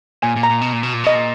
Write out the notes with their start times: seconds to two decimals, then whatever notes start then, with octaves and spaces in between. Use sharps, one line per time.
0.23 A#2 G#5
0.36 A#2
0.43 A#5
0.50 A#2
0.61 B2
0.73 A#2
0.83 B2
0.94 A#2
1.04 B2 D#5
1.15 A#2